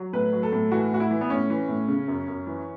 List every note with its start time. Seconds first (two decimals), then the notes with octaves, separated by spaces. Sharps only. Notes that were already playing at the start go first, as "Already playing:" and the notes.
Already playing: F#3
0.13 A2 B4
0.33 F#3
0.43 A4
0.52 A2
0.71 E3 F#4
0.91 A2 F#4
1.00 E4
1.11 E3
1.21 B3
1.30 A2 C#4
1.50 E3
1.68 A2
1.88 C#3
2.08 F#2
2.28 F#2
2.47 E3